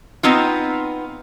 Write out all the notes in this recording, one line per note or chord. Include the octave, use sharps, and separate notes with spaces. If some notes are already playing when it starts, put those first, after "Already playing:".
B3 C4 D#4 F4